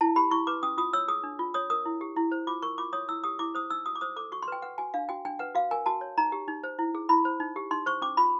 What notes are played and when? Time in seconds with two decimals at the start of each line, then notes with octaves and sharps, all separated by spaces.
0.01 E4 A5
0.16 G4 B5
0.31 E4 C#6
0.47 B4 D6
0.63 C#4 D#6
0.78 F4 D#6
0.93 C#5 E6
1.08 G#4 D#6
1.23 D4
1.39 F4
1.54 C#5 D#6
1.70 A#4 D#6
1.86 E4
2.01 G4
2.16 E4
2.32 C5
2.47 F4 D6
2.62 A#4 C#6
2.78 F4 D6
2.93 C#5 D#6
3.09 E4 E6
3.24 G4 D#6
3.39 E4 D6
3.55 C5 D#6
3.70 D#4 E6
3.86 F#4 D#6
3.95 D6
4.01 C5 D#6
4.16 A4 D6
4.32 F#4 C#6
4.42 C6
4.48 B4 G5
4.62 B4 F#5
4.78 F#4 G#5
4.94 D4 F5
5.09 F#4 G5
5.25 D4 G5
5.39 B4 F#5
5.55 F#4 F5
5.71 A#4 G#5
5.86 F#4 A5
6.01 C#5
6.18 D#4 A#5
6.32 G4
6.48 D#4
6.64 C5
6.79 E4
6.95 G#4
7.09 E4 B5
7.25 C5
7.40 D#4
7.56 G4
7.71 D#4 C6
7.86 C5 C#6
8.02 C#4 D6
8.17 F4 B5